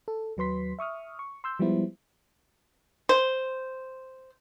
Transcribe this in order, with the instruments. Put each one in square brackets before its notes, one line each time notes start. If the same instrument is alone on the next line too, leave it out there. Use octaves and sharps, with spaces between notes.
[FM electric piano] A4
D#2 F#3 B4 C6 B6
E5 C#6 D#6 F6
C#6
C6 E6 G6
F3 G3 G#3 B3 E4 C5
[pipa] C5